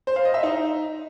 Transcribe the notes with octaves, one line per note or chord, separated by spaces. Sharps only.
C5
F5
D#5
E5
D#4